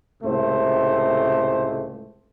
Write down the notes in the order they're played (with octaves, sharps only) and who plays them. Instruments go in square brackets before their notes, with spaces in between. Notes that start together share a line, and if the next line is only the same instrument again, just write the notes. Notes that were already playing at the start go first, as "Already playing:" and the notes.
[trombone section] C#2 A2 C3 A3 C5